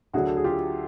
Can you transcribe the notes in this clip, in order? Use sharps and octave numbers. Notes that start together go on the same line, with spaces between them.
D2 D3 F#3 F#4 G#4
A4
G#4
F4 G4